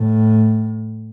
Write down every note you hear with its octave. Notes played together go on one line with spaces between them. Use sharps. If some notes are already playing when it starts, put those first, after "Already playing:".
Already playing: A2